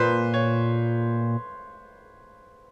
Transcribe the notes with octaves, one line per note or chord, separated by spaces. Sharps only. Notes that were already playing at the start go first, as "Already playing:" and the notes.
Already playing: A#2 B4 C5
C#5